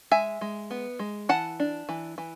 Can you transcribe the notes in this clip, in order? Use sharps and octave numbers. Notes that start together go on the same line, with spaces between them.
G#3 E5 G#5
G#3
B3
G#3
E3 F#5 A5
D4
E3
E3